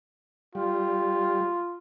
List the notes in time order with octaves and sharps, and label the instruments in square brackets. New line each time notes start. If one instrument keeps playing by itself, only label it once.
[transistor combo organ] G3 [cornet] F4